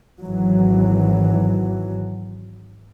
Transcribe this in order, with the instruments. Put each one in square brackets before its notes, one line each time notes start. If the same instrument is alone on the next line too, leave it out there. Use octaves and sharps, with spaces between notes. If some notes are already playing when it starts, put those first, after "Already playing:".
[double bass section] G#1 E3 F#3